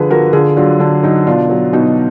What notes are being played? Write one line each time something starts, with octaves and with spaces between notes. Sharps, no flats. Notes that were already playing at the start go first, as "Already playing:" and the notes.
Already playing: D3 F3 G#4 B4
F3 F#4 A#4
D3 F4 G#4
F#3 D4 F4
D3 D4
F#3 D#4
B2 D4 F4
F#3
B2 D#4 F#4